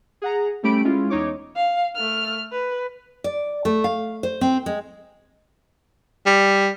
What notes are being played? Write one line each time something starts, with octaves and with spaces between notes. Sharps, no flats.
G#4 F#5 A#5
G3 A3 C#4 G4 B5 D7
G#3 C#4 E4 F4
E2 D#4 C#5 D6
F5
A3 F6
B4
D5
A3
F5
C5
C4
G#3
G3